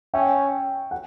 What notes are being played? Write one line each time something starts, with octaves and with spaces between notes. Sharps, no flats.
C#4 E5 G5
F#5